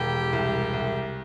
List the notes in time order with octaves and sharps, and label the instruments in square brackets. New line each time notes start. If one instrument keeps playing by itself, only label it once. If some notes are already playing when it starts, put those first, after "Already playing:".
Already playing: [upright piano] E1 [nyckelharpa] G4
[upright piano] C2
C2